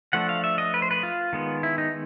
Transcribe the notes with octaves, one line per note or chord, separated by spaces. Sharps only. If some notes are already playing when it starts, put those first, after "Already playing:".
F3 A3 D4 F#5
F5
E5
D#5
B4
C5
B4
F4
D#3 G#3 B3
E4
D#4